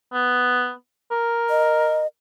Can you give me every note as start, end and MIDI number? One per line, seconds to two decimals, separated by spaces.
0.13 0.72 59
1.11 2.03 70
1.50 2.07 75